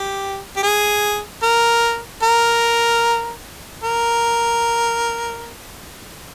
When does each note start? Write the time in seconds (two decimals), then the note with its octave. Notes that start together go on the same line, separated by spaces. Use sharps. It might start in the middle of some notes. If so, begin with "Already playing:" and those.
Already playing: G4
0.56 G4
0.63 G#4
1.43 A#4
2.23 A#4
3.84 A#4